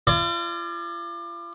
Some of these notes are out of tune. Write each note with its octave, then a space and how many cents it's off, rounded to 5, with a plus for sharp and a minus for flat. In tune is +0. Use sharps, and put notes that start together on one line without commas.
F4 -40 D5 +30